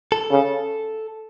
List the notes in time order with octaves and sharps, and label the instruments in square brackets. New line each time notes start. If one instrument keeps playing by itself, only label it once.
[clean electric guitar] A4
[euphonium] C#3